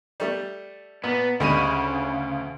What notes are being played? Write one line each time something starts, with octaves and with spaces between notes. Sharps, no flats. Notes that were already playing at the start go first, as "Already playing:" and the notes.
G3 A3
A#2 B3
D2 C#3 G3 G#3 F#5 B5 C#6 D#7